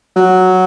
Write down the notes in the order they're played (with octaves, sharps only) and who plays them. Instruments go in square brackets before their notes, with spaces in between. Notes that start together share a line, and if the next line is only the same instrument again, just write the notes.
[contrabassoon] F#3